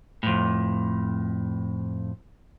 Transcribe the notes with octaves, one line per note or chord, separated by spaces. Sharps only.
F2 A2